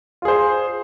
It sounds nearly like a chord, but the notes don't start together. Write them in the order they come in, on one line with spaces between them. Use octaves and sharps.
F4 G#4 C5